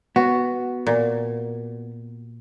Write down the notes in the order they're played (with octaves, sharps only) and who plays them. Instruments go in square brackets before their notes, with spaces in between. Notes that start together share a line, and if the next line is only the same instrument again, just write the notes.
[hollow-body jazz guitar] B3 [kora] F#4
[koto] A#2